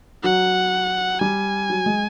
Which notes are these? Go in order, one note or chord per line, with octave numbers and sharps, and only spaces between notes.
F#3 F#5
G3 G#5
F#3
G#3